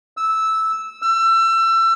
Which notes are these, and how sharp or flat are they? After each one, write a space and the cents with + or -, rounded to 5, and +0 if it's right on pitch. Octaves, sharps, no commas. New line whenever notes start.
E6 -10
E6 +30